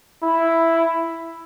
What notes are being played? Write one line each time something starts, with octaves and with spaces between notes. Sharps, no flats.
E4